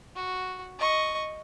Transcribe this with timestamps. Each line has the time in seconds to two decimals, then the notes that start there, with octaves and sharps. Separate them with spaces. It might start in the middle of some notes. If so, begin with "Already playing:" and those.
0.15 F#4
0.79 D#5 C#6